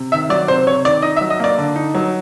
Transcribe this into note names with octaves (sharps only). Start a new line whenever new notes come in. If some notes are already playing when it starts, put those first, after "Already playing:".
Already playing: C3
D#3 E5
F#3 D5
C3 C5
C3 C#5
D#3 D5
D#4 D#5
E5
F#3
D#5
A#3 D5
D3
D#4
F#3